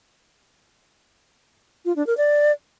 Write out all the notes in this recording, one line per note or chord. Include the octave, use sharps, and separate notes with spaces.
F4
D4
A#4
D5